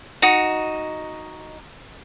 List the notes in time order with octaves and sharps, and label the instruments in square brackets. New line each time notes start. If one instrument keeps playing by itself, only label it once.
[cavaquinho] D#4 F#4